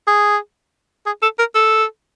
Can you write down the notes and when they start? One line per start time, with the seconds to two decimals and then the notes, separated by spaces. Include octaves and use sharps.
0.07 G#4
1.06 G#4
1.22 A4
1.39 A#4
1.55 A4